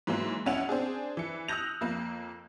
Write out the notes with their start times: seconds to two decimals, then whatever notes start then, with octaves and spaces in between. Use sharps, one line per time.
0.07 G#2 E3 F#3 A#3
0.46 B1 C#4 E4 F#5 F7
0.69 C4 D4 G#4
1.17 E3 C#7
1.48 D#6 E6 F#6 G6 A#6 F7
1.81 F2 A#3